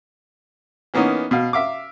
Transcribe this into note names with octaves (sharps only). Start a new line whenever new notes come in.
E3 A#3 B3 C#4 D#4
B2 F5
E5 F5 D6